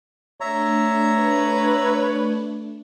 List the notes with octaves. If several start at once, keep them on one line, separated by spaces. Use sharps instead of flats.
A3 D4 C#5 E5 A#5
B4